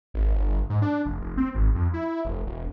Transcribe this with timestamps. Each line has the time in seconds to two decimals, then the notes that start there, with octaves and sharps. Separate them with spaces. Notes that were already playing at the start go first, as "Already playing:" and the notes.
0.14 G#1
0.34 G1
0.70 G#2
0.82 D4
1.06 F1
1.22 F1
1.37 C4
1.55 G#1
1.75 F2
1.93 E4
2.25 F1
2.46 E1